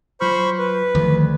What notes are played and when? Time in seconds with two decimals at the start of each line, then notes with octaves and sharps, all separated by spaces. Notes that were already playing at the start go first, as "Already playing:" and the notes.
0.21 F#3 F4 C5 B5 C#6 F6
0.59 B4
0.95 D2 D#3 F3